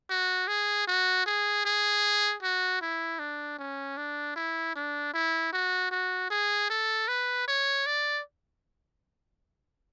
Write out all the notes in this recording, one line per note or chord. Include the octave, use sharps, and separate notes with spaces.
F#4
G#4
F#4
G#4
G#4
F#4
E4
D4
C#4
D4
E4
D4
E4
F#4
F#4
G#4
A4
B4
C#5
D5